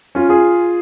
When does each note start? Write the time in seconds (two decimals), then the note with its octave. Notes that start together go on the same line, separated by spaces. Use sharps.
0.15 C#4 F4
0.29 F4 G#4